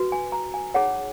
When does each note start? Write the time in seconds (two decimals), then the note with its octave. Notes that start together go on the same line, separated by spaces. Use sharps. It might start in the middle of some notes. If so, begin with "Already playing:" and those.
Already playing: F#4 B4
0.12 G#5
0.32 A#5
0.54 G#5
0.74 D#4 G#4 C#5 F#5